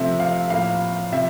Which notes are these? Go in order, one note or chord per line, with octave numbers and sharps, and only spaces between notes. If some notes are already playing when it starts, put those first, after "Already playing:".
Already playing: C3 F3 A3 C4 E5
F5
A2 F3 A#3 F5
C3 F3 E5